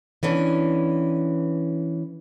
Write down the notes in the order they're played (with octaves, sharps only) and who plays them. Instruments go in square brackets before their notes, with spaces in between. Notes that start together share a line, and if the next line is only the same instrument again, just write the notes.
[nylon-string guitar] E3 B3 C#4 D4